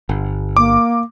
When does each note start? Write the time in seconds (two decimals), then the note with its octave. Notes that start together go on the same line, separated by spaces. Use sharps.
0.09 G1
0.57 A#3 D6